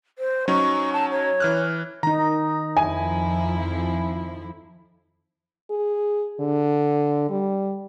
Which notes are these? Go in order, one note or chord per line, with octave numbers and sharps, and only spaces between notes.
C5
F#3 C#4 D#4 C#6
A5
C#5
E3 F6 F#6
D#3 D#4 A#5
F2 F3 E4 G#5
G#4
D3
G3